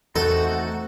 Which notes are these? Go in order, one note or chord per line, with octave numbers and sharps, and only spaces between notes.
E2 A3 C4 D#4 F#4 A4